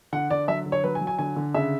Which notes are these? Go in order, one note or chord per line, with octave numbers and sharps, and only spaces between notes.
D3 F#5
D3 D5
F#3 E5
D3
C#5
F#3 B4
G#5
F#3
G#5
D3 G#5
D3
C#3 E5